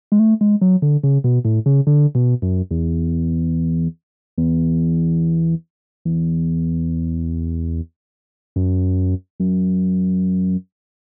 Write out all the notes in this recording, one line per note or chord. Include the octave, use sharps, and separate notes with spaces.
G#3
A3
G#3
F#3
D3
C#3
B2
A2
C#3
D3
B2
F#2
E2
E2
E2
F#2
F#2